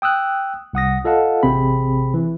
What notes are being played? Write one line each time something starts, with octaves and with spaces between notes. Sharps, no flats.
G5 D#6 E6 F#6
C2 F#5 D#6 A#6
F4 A4 D#5 F5 F#5 A5
A1 C3 C4 G#4 B5
E3